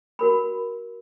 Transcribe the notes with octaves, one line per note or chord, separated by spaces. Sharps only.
F#4 A#4 B5